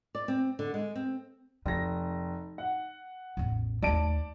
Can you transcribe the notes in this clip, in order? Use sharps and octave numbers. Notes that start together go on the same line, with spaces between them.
D5
C4
D3
G#3
C4
F1 D#4 A#6
F#5
A1 E2
D#2 A3 D5 A5 D7